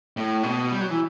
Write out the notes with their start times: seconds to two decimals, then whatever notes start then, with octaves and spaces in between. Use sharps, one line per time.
0.17 A2
0.43 B2
0.72 G3
0.81 F#3
0.91 E3